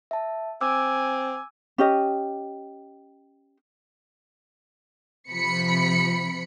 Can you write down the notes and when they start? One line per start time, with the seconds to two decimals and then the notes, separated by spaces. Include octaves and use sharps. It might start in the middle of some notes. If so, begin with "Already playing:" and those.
0.11 E5 A5
0.61 C4 G#5 D6 E6
1.78 C#4 G4 D#5
5.31 C3 F3 B5 C#7